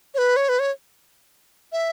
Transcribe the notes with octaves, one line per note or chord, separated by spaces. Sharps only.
C#5
B4
C#5
B4
C#5
E5